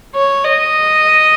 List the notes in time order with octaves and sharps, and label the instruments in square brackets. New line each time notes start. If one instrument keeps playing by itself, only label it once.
[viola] C#5
D#5